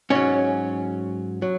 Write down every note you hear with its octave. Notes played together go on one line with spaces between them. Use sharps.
G#2 F#3 C#4 C#5
F#3